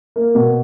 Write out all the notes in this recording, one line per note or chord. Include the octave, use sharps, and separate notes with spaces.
A#3
B2